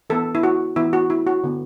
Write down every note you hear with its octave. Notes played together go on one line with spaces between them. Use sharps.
E3 B3 A4
E4
F#4
E3 B3 E4
F#4
E4
F#4
D3 B3